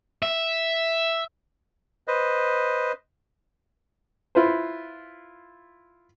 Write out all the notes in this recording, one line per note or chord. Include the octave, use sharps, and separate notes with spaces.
E5
B4 C5 D#5
E4 F4 B4 C5